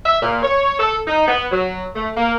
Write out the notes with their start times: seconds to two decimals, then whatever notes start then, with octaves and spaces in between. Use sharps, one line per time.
0.05 E5
0.22 A#2
0.43 C#5
0.79 A4
1.07 D#4
1.28 B3
1.52 F#3
1.95 A3
2.17 A#3